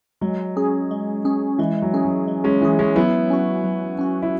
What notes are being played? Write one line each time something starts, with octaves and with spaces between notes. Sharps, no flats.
F#3 G#3
C#4 G#4
G#3
C#4 G#4
E3 G#3
F#3
C#4 G#4
F#3
G#3
G#3 C#4
E3 C#4 G#4
G#3 C#4
F#3 B3 E4
C#4 F#4
F#3
C#4 F#4
E4